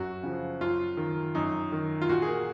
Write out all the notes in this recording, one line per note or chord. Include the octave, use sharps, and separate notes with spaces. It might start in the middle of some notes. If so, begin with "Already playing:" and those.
Already playing: F#2 F#4
C#3 F3
F#2 F4
D#3
F#2 D#4
D#3
F4
A#2 F#4
G#4
A#4